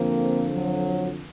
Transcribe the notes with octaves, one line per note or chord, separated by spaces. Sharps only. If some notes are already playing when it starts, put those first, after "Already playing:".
Already playing: F2 D3 F3 A#3 C4
F#3